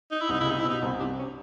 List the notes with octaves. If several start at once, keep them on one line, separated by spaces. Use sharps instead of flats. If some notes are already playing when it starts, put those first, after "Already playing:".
D#4
E4
C2 C3 D#4
C#3 E4
C2 C3 D#4
E4
B2 D#4
C2 C3
C2 C3 D4
C#4